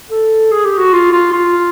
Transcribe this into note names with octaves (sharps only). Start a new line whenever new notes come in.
A4
G#4
G4
F#4
F4
F4
F4